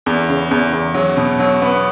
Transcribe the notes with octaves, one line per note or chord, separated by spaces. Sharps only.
E2
C#3
E2
E2
F#3
B2
F#3
B3